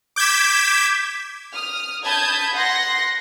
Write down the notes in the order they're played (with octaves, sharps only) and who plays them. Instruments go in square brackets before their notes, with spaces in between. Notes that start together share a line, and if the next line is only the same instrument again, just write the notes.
[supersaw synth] D6 G6 G#6 B6 E7
[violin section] D#6 F6
A5 B5 D#6 G6 G#6
F#5 C6 A#6